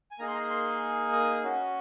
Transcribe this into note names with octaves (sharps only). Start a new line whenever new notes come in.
G#5
A#3 D#4 G#4 A#5
C6
A#5
C6
D#6
C#4 F#4